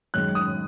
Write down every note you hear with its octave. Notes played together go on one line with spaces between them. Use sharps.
F#2 D#3 G#3 F#6
D#6